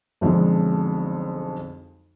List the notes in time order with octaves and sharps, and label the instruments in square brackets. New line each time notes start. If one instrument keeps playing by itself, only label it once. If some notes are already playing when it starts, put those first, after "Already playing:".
[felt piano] B1 F2 D3 G#3